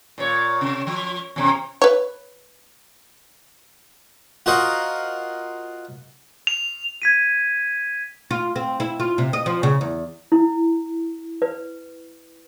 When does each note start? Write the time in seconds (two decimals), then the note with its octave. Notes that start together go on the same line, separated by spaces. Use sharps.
0.18 A#2 C#5
0.61 C3
0.87 F3
1.36 E2 C3 C#4
1.82 B4 C#5
4.46 F4 F#4 A#4 C5 D#5 F#5
6.47 F7
7.02 G#6 B6 D#7
8.31 F4
8.56 C4
8.80 E4
9.00 F4
9.18 C3
9.33 D#5
9.46 F3
9.63 C#3
9.81 E2
10.32 E4
11.42 B4